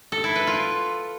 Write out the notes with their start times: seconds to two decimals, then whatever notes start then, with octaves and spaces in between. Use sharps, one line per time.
0.12 A4
0.24 E4
0.36 B4
0.47 F4